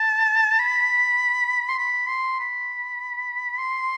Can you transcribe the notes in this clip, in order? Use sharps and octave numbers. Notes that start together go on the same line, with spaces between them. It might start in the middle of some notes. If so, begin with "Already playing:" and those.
Already playing: A5
B5
C6
B5
C6
B5
C6